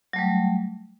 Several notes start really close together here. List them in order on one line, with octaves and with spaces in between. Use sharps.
F#3 A3 G3